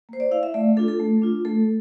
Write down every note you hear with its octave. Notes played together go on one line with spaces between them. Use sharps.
A#3 C5
D5
E4 F5
E5
A3 D5
D4 F4 A4
A4
A3
D4 F4
A3 A4